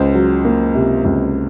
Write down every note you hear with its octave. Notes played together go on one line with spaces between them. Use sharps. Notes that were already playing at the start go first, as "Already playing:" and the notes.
Already playing: C#2 C5
F#3
A#3
C3
C#2